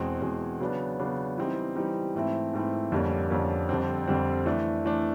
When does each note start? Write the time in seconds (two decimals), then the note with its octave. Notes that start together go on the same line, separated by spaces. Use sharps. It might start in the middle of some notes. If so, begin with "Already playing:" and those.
Already playing: E2 B2 G#3 C4
0.22 E2 B2 G#3 C4
0.60 C#3 F#3 B3 D4
0.99 C#3 F#3 B3 D4
1.37 E3 G3 C4 D#4 G4
1.76 E3 G3 C4 D#4 G4
2.14 G#2 E3 A3 C4 E4
2.53 G#2 E3 A3 C4 E4
2.92 F2 D3 G3 A#3 C#4
3.30 F2 D3 G3 A#3 C#4
3.69 F2 D3 G3 C4
4.07 F2 D3 G3 C4
4.46 E3 A3 D4
4.85 E3 A3 D4